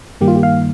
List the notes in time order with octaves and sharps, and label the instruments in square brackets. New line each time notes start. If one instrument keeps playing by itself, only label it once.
[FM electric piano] G2 D#3 G3 A#3 G4
F4
G4
F5